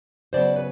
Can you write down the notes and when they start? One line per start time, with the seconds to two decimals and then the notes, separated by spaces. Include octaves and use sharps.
0.33 C#3 F#3 B3 C5 D5
0.56 B4